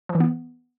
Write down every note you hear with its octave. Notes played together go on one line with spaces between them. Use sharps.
F3
E3
B3